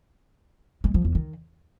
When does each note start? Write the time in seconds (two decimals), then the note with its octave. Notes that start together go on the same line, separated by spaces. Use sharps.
0.84 G#3
0.94 F3
1.05 E2
1.15 D#3